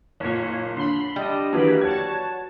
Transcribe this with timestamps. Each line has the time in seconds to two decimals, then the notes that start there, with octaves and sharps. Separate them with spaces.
0.20 F#1 A#2 C#5
0.77 D3 B5 C6
1.16 G3 D4 D#5
1.53 D3 E3 F#3 A#3 G4 B4
1.81 F#4 C#5 A5 G#6